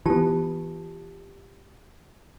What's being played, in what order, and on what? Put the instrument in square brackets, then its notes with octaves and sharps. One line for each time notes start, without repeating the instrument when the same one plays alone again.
[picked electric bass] E3 B3 [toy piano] F4 G4 A5